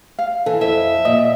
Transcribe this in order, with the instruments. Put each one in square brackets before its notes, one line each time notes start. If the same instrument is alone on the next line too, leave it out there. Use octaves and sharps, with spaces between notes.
[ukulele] F5
[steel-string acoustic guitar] E3 [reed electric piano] A4
[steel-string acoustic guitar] F2 [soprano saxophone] E5
[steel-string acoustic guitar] A#2 [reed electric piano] D#5